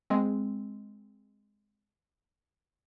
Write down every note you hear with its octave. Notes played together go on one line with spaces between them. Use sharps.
G#3 C4